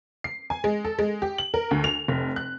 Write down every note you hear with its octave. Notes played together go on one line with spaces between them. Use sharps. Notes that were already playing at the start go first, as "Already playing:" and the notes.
C7
G#5
G#3
A4
G#3
G4
F#7
A#4
D2
F7
F1
F#6